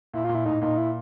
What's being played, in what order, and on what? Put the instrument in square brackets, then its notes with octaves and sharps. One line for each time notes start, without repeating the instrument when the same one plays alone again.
[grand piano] A#2 [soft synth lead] E4
[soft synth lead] F4
[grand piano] A#2
[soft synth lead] E4
[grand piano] A2 [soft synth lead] D#4
[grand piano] A#2 [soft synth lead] D#4
[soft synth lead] E4